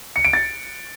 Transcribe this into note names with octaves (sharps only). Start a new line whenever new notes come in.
C#7
D7
A6